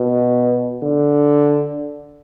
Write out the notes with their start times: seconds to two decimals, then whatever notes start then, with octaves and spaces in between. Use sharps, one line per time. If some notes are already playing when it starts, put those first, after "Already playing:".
Already playing: B2
0.82 D3